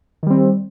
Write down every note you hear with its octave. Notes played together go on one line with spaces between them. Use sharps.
D#3 G3 C4